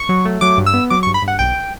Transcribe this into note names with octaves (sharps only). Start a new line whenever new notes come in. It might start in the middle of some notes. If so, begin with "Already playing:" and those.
Already playing: C#6
F#3
A3
F#3 D6
G2
E6
B3
F#3 D6
C#6
G2
B5
G2
F#5
B1 G5